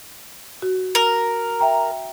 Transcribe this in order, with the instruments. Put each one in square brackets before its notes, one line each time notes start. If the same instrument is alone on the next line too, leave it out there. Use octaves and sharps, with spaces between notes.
[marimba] F#4
[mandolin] A#4
[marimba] E5 G5 A#5